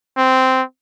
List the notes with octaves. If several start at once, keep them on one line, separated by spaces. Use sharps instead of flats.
C4